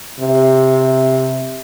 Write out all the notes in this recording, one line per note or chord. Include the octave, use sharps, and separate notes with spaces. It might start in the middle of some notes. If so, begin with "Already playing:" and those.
C3